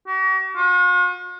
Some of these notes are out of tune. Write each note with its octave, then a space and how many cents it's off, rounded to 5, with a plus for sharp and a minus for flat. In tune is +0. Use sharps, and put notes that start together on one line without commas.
F#4 +45
F#4 -45